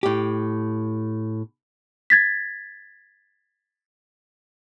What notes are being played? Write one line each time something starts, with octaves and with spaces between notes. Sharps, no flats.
A2 G4
G#6 A6 B6